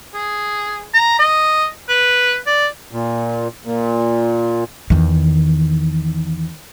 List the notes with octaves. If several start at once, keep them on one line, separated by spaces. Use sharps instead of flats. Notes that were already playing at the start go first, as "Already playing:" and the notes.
G#4
A#5
D#5
B4
D5
A#2
A#2
E2 D#3